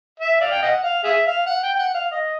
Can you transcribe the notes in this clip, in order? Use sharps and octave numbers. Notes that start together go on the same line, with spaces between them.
E5
D5 F5
G5
D#5 F#5
F5
G#4 E5
F5
F#5
G5
G5
F#5
F5
D#5